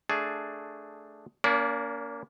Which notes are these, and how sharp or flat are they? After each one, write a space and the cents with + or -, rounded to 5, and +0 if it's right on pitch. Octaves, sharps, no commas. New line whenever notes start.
A3 +0 D4 +5 G#4 +10
A#3 +0 C#4 +45 D5 -25